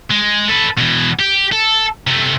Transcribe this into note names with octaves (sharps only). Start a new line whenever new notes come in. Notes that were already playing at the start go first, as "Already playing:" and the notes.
G#3
A4 B4
B2 E3
G4
A4
C3 A3